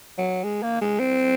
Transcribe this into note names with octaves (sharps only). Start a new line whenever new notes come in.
F#3
G#3
A#3
G#3
C4